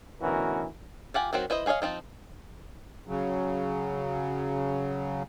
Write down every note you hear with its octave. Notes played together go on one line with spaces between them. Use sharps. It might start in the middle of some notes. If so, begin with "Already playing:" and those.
D2 B2 E3 C#4 F#4 A#4
F4 G4 F#5 G#5
D#3 F#3 C4 F#4
E4 B4 C5 D#5
B3 G#4 C#5 D#5 F5
F3 F#3 C4 D#4
C#3 F#3